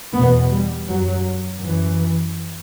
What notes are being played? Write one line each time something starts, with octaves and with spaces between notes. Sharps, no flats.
E2 B2 B3
G3
F#2 F#3
F#2 E3